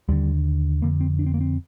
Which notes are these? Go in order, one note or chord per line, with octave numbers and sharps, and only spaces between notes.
D#2 D3 G3
F2 D3 A#3
C4
D4
C4
A#3
C4